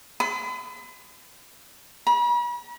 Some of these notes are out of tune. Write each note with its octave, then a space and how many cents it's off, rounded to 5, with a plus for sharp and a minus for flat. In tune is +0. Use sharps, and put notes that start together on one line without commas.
B5 +40
B5 -45